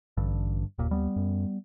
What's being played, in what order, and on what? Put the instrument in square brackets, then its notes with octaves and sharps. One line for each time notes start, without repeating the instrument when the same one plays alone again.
[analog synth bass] A1 [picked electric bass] G2 D3
[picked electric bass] F#1 A#2 [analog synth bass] D#2
[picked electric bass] G3 B3
[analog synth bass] F#2